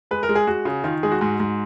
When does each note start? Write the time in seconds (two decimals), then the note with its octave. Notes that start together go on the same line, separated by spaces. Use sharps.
0.11 G#3 B4
0.23 A#4
0.29 G#3
0.35 G#4
0.47 G#3 F#4
0.65 C#3
0.84 D#3 F4
1.03 G#3 G#4
1.12 F#4
1.21 G#2
1.40 G#2